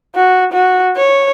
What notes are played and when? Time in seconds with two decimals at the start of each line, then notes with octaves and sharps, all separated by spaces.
0.15 F#4
0.52 F#4
0.96 C#5